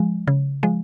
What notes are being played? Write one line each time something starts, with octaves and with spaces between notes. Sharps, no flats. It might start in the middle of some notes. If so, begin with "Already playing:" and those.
Already playing: F3 G#3
C#3
F3 G#3